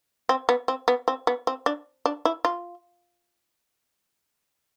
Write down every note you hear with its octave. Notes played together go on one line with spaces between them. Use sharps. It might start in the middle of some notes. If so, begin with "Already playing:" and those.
C4
B3
C4
B3
C4
B3
C4
D4
D4
E4
F4